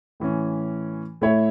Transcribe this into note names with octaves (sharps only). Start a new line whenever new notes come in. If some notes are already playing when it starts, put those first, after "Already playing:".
A2 E3 C#4
A2 A3 E4 C#5 E5